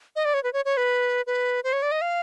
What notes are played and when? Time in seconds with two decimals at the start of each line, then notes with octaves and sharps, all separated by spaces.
0.16 D#5
0.25 D5
0.34 C#5
0.43 B4
0.53 C#5
0.65 C#5
0.77 B4
1.27 B4
1.64 C5
1.73 C#5
1.82 D5
1.92 D#5
2.02 F5